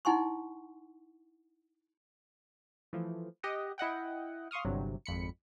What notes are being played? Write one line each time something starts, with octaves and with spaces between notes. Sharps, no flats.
D#4 E4 F#5 G#5 C6 C#6
E3 F3 A3
G4 D#5 F#5
E4 D#5 F#5 G5
F5 C6 C#6 D#6 F6
G1 G2 C3 F#3
G#1 F2 B5 C#7